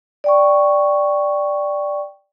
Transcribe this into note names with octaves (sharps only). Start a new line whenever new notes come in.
D5 G5 C#6